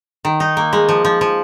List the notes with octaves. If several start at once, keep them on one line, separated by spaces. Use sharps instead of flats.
D#3
D#4
A#3
G#3
F3
F3
F3